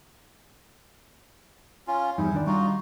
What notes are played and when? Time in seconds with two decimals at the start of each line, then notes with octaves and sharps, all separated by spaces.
1.87 C#4 F4
2.18 E2 G2 D#4 E4
2.33 D#3 D4 D5
2.47 G3 D#4 F4 F#4